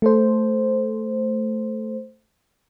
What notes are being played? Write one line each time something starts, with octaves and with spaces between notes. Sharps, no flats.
A3 A4 C5